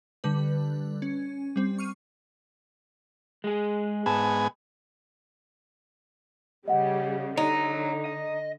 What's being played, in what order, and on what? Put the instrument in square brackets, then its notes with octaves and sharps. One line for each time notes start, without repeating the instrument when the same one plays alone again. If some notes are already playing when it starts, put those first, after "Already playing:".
[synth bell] D3 G3 B4
C#4
G3 C4
C#6 F6 D#7
[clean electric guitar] G#3 G#4
[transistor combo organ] G#2 B3 G#5 [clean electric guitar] A5
[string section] C#3 G3 [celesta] D#5 F#5
[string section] D3 [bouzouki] D#4 [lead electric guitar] C#5 A#5
[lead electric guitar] D#5